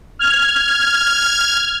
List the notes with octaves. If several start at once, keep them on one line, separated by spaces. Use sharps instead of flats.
F6 G#6